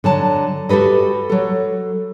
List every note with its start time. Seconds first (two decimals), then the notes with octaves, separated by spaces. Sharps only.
0.04 D3 F#3 A5
0.69 F#4 G4 A4 B4 D#5
1.30 F#3 A4